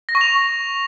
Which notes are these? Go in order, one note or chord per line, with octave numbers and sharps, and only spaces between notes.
A#6
C#6
F7